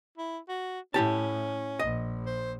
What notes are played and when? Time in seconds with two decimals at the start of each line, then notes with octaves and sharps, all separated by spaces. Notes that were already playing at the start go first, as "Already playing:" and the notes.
0.18 E4
0.49 F#4
0.94 A2 C#4 E4 G4 A5
1.79 A#1 D#5
2.26 C5